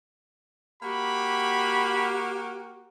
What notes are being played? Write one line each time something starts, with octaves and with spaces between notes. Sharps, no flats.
A#3 F#4 G4 B5